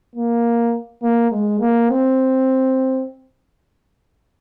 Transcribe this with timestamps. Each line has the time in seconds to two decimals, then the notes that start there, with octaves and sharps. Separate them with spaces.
0.15 A#3
1.02 A#3
1.31 G#3
1.60 A#3
1.90 C4